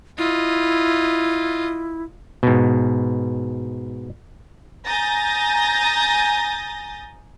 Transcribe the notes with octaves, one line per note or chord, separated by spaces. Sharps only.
E4 F4 D#5
G#2 B2
G#5 A#5 D#6 G6 A6 A#6